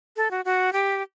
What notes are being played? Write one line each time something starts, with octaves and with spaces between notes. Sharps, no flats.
A4
F#4
F#4
G4